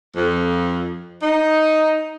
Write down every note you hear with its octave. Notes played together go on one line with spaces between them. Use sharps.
F2
D#4